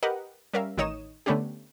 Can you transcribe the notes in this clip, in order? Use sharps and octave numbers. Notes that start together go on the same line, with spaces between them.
G4 A#4 B4 D#5 F#5
G3 C#4 A#4 E5 F5
A1 D#3 D#4 C#5 D#6 E7
D3 A3 B3 C#4 D4 G4